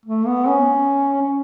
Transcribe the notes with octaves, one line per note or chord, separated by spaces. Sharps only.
A3
B3
C#4
C#4